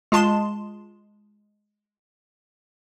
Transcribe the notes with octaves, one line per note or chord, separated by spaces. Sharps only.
G#3 F4 A5 C6 E7